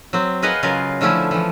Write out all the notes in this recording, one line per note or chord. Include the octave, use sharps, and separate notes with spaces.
F#3 C4
G#4 A#4 B4 D#5 F5 F#5
C#3 F#3 F4 A#4 B4 F5
D3 F3 A3 C#4 E4
E3 F3